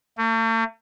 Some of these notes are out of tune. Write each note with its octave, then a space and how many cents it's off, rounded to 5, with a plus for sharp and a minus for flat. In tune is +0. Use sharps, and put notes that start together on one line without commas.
A3 +45